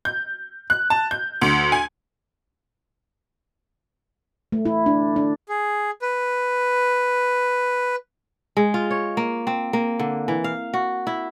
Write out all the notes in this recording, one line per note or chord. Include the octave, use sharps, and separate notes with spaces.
G6
F#6
A5
G6
D2
G#5
A3
E4
D4
D4
G#4
B4
G#3
F4
C#5
A#3
C4
A#3
D3
E3
F5
F#4
E4